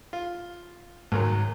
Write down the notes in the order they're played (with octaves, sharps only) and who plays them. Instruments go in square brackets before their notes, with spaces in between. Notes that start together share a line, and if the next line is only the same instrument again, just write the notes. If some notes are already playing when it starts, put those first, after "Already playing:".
[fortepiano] F4
[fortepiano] C#2 D#3 F#3 [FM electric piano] G#2